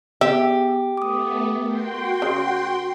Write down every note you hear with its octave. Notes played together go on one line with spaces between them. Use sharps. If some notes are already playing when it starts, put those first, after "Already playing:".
B3 G4 G#4 E5
A3 B3 D6 D#6
F#4 A#4 G5 C6
C#3